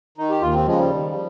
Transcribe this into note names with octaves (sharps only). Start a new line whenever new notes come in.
D#3 D#4
G4
D#2 F4
C4
C#3 F3 G#3
G3
D#2
F3